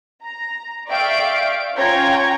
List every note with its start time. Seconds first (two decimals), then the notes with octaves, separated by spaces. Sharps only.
0.23 A#5
0.88 D5 E5 F5 G5 C#6 D7
1.76 C#4 F4 C#5 G5 A#5 G#6